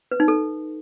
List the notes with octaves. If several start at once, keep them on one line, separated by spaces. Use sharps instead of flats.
B4
D#4
A4